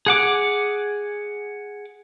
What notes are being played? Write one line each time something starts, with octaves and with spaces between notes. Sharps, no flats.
G#4 F#5 D6